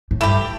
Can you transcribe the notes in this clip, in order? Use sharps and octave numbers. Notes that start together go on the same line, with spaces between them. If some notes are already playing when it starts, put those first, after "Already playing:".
A2
G2 A3 E4 G4